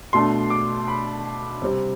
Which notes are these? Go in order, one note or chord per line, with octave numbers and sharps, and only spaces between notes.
B2 A3 D4 C6
D6
B5
C3 G3 C4